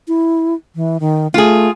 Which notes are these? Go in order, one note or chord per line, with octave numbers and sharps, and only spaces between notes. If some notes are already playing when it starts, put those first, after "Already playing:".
E4
E3
D#3
A3 F4 G#4